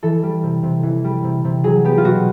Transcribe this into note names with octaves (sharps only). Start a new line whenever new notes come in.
E3 A4
G3
C3
C3
E3
G3
C3
C3
F#3 G#4
B3 G4
F4
B2 F#4